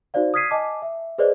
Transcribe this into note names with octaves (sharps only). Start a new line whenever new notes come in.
D#4 F#4 C5 D5 F5
D#6 F6 G#6 B6 C7 D#7
D#5 G#5 A5 D6
E5
G#4 B4 C5 D5 D#5